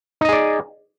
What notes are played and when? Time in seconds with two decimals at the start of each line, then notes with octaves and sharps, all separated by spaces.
0.21 D#4
0.25 D#5
0.29 G#4
0.33 D5